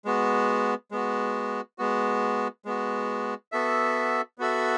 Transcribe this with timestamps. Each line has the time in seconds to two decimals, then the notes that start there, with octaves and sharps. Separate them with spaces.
0.05 G#3 B3 F#4
0.91 G#3 B3 F#4
1.78 G#3 B3 F#4
2.65 G#3 B3 F#4
3.52 B3 F#4 A4 E5
4.38 B3 F#4 A4 E5